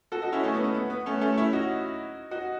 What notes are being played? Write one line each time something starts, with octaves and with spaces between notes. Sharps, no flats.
F#4 A4
D#4 F#4
C#4 E4
A3 C#4
B3
B3
B3
B3
A3 C#4
A3 C#4
C#4 E4
D#4 F#4
D#4 F#4